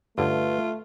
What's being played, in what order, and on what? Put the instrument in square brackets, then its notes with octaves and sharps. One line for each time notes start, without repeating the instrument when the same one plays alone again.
[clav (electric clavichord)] G2 D3 C#4 [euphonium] A3 [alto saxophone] F4 [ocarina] B4